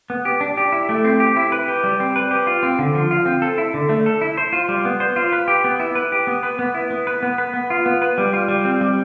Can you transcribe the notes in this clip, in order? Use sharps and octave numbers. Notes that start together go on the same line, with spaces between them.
B3
G4
D4
G4
E4
A3
C4
G4
E4
B4
G4
G3
C4
B4
G4
F4
C4
D3
F3
F4
C4
A4
E4
D3
A3
A4
E4
C5
F4
G3
B3
C5
F4
B4
G4
B3
E4
B4
G4
B3
B4
B3
E4
B3
B4
B3
B4
B3
F4
B3
B4
G3
F4
G3
C4
G3